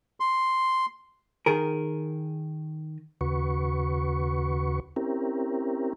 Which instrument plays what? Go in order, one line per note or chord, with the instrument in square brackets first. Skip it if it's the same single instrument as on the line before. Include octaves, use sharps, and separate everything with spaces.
[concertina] C6
[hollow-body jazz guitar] D#3 G#4 A#4
[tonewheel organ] D#2 C#3 F#4 B4 C#6
C4 C#4 E4 G4 A#4